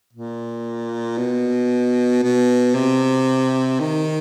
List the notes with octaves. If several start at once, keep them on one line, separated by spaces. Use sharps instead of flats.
A#2
B2
B2
C3
D#3